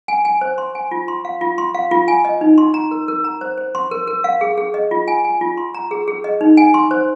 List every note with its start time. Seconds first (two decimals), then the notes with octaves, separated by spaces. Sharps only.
0.08 G#5
0.25 G#5
0.41 C5
0.58 C6
0.75 G#5
0.91 F4
1.08 C6
1.25 F5
1.41 F4
1.58 C6
1.75 F5
1.91 F4
2.08 G#5
2.25 D#5
2.41 D#4
2.58 C6
2.74 A#5
2.91 A#4
3.08 A#4
3.24 A#5
3.41 C5
3.58 C5
3.75 C6
3.91 A#4
4.07 A#4
4.24 F5
4.41 G#4
4.57 G#4
4.74 D#5
4.91 F4
5.08 G#5
5.25 G#5
5.41 F4
5.57 C6
5.74 A#5
5.91 G#4
6.08 G#4
6.24 D#5
6.41 D#4
6.57 G#5
6.74 C6
6.91 C5